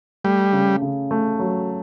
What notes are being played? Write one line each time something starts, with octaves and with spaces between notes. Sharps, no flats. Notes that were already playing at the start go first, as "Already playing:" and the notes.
G3 A3
C#3
C#3
A3
F#3